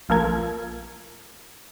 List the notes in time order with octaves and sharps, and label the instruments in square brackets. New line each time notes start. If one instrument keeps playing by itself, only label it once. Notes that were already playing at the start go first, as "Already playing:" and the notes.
[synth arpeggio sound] A#1 F4 A4 A#4 G#6